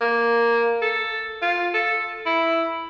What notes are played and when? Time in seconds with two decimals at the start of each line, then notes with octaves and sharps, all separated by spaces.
0.01 A#3
0.82 A4
1.42 F4
1.74 A4
2.26 E4